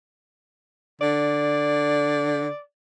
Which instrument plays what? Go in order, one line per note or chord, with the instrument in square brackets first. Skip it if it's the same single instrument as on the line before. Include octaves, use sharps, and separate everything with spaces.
[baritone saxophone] D3 [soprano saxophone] D5